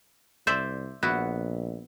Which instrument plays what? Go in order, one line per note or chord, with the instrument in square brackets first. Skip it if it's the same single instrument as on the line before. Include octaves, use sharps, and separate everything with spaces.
[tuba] C2 [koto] C5 D5 E5
[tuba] A#1 [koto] B3 E4 F#4